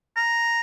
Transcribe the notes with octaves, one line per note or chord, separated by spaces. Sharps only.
A#5